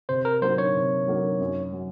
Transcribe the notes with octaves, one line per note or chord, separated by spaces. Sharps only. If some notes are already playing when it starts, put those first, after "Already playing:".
C3 C5
A#4
F#3 A#3 D#4 C5
C#5
C3
F#3 A#3 D#4
F#2
F#3